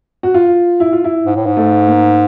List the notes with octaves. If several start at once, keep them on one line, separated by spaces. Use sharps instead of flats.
F#4
F4
E4
F4
E4
G#2
A2
G#2
A3
A#3